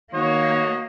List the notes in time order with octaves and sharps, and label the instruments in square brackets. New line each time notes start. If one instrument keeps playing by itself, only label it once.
[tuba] D#3 [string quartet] A#3 [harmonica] F#4 D#5 [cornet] C#5